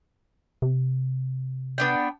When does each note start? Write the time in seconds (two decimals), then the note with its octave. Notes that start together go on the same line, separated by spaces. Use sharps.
0.62 C3
1.78 B3 D4 G5